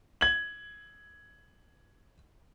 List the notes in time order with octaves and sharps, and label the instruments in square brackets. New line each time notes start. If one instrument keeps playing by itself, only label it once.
[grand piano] G#6 F#7